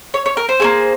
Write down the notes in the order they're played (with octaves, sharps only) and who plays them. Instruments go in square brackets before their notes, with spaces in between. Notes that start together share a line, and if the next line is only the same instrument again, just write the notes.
[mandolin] C#5
C#5
A#4
C5
A#3 C#4 G#4